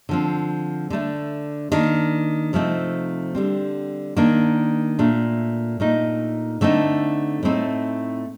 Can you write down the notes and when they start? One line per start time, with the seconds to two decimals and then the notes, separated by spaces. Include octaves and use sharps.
0.09 D3 F3 C4
0.90 D3 A3 D4
1.72 D#3 A#3 D4
2.53 C3 F3 A3 C4 D#4
3.35 D3 G3 C4
4.17 D#3 A#3 D4
4.99 A#2 A3 D4
5.80 A#2 A3 D#4
6.61 D3 A3 C4 D#4
7.43 A2 A3 C4 D#4